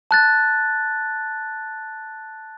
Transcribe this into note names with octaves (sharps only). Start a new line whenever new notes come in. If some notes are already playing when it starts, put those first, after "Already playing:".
A5 F#6 A6